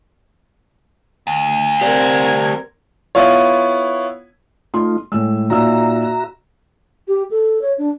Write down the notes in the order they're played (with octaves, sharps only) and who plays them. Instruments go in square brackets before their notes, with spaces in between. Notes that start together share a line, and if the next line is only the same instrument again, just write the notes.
[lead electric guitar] D2
[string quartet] C4 A#4 G#6 [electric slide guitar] G4 C5 D5
[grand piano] B3 E4 F4 C#5
[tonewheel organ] A3 D#4 F4 [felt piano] C6
[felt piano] A2 E6 [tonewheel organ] G#3
[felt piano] A#2 D#4 E6 [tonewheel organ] F#4 E5 A#5
[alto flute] G4
A4
C#5
D4